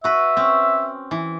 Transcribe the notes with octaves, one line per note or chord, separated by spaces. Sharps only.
F#4 B4 E5
C4 C#4
E3